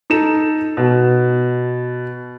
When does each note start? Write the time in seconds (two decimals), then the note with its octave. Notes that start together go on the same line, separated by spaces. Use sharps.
0.10 D#4 A4 E7
0.77 B2